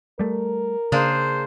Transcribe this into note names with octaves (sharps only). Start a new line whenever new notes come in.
G3 A3 A#4
C#3 A#3 D4 G#4 C5